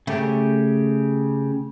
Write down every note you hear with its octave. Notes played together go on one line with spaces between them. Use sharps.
C#3 A3 G4